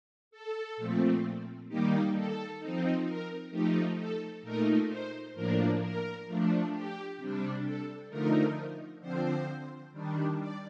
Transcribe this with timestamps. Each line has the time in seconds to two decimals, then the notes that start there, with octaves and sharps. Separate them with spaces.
0.31 A4
0.77 A#2 F3 A3 C4
1.68 D#3 G3 A#3 D#4 G4
2.14 A4
2.59 F3 C4 D#4
3.06 A#4
3.51 F3 A3 D#4 G4
3.97 A4
4.42 A#2 A3 D#4 A#4
4.89 C5
5.34 A2 F3 A#3 D4 A#4
5.80 A#4
6.26 F3 A3 D4
6.72 G4
7.17 C3 G3 D4
7.63 A4
8.09 D3 F3 A3 D#4 A#4
9.00 D3 F3 C4 C5
9.92 D#3 G3 D4
10.38 D5